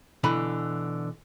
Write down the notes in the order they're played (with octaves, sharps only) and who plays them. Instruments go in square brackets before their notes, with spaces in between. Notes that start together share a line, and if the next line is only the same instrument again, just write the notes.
[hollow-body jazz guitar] B2 D3 E3 B5